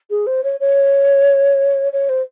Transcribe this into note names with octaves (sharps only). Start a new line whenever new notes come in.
G#4
C5
C#5
C#5
C#5
C5